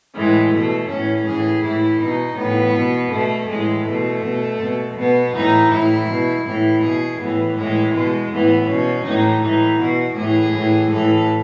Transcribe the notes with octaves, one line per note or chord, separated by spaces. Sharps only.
A2 E3 G#3
B2 A3
A2 E3 C#4
A2 E3 G#4
A2 E3 E4
B2 D#4
A2 E3 B3
B2
B2 A3
A2 E3 G#3
B2 A3
B2
B2
B2 B3
A2 E3 D#4
A2 E3 E4
B2
A2 E3 E4
B2 G#4
A2 E3 B3
A2 E3 G#3
B2 G#3
A2 E3 B3
B2 C#4
A2 E3 D#4
A2 E3 D#4
B2 F#4
A2 E3 G#4
A2 E3
A2 E3 A4